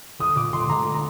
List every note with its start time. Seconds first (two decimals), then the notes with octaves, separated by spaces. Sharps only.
0.19 D3 D#6
0.36 A#2 D6
0.53 D3 C6
0.70 D3 A#5
0.95 A#5